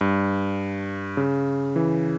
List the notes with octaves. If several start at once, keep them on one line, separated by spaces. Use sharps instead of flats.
G2
C#3
E3